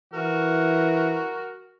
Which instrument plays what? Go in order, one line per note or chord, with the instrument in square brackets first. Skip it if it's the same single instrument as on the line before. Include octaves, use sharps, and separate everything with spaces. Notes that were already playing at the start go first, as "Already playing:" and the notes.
[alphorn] E3 [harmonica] F#4 A#4